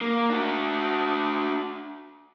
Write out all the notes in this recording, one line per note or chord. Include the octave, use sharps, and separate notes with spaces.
A#3
D4 F#4